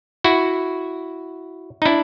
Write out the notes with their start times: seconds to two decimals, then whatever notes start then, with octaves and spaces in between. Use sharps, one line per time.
0.24 E4 F#4
1.82 D#4
1.85 D4 E4